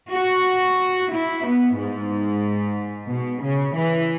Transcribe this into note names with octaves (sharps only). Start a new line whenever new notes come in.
F#4
E4
B3
G#2
B2
C#3
E3